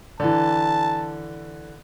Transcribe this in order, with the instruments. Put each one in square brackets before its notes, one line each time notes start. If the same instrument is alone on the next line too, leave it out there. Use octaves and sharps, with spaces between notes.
[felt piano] D3 E3 [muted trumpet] A5